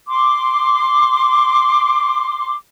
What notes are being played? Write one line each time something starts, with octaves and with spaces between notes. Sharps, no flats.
C6 D6